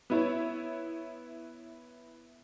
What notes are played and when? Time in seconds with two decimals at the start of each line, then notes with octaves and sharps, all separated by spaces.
0.10 B3 E4 C#5